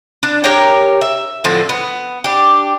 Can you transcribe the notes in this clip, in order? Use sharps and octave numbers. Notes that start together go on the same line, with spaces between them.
D4
G4 A#4 C#5 G5
E5
A2 D3 F3 C4
B3
D4 G4